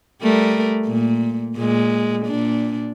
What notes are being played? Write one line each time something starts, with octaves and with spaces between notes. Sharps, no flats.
G3 A3 A#4
A#2
A#2 G#3
A#2 D4